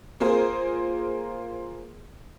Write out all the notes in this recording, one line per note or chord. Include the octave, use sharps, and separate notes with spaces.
A#3 F4 G#4 A#4 C5